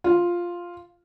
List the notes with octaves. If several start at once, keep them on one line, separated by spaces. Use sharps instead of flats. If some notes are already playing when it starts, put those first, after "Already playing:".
F4